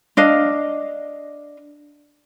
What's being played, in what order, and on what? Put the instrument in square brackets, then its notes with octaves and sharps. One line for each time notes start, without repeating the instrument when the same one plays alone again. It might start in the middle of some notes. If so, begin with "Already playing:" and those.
[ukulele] D4 D#5 F5